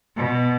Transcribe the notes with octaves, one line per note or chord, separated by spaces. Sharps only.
B2